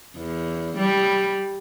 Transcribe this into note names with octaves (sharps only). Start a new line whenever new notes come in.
E2
G3